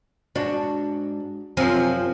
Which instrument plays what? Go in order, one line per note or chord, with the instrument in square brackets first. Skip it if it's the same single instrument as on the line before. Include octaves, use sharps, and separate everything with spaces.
[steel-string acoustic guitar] G#2 [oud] D4 F#4
[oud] F#2 F3 [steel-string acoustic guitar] C3 G#5